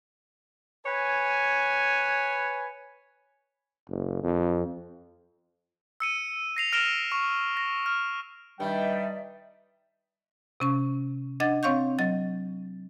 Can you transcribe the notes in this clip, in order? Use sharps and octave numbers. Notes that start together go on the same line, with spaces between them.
B4 C#5 G#5
F#1
F2
E6 C#7 D#7
A#6 C7 F7
F6 A#6 D7 E7 F7 G7
C#6
A#6
F6
G2 D#3 G3 D5 E5 G5
C3 C#4 C#6
D4 D#5 F#5 G#6 A6
C4 C#5 F5 C#6 G6
F#3 D#5 A6